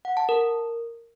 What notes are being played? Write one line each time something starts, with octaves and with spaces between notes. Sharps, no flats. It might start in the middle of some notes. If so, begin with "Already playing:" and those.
F#5
A5
A#4